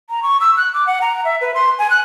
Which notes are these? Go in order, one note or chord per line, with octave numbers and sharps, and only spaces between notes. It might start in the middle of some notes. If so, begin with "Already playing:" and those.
A#5
C#6
E6
F#6
D6
F#5
A#5
E5
B4
C6
G#5
F#6